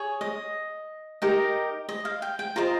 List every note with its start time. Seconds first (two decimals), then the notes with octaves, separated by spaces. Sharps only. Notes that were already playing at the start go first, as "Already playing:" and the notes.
Already playing: G#4 C#5
0.21 D#5
1.22 D#4 G4 A#4 D#5
1.89 D#5
2.05 F5
2.22 G5
2.39 G5
2.56 F4 C5 D#5 A#5